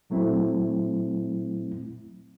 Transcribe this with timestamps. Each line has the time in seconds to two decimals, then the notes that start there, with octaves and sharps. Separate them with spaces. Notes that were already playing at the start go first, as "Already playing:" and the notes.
0.10 A#2 F#3 A3 C4 E4